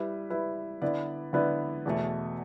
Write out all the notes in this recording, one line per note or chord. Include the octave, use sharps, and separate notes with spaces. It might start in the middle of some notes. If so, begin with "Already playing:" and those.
Already playing: G3 E4 B4
G3 E4 B4
D3 B3 E4 B4 D5
D3 B3 E4 B4 D5
E2 B2 A3